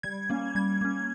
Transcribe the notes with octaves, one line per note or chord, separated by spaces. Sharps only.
G3 G#6
A#3 C#4
G3 G#6
A#3 C#4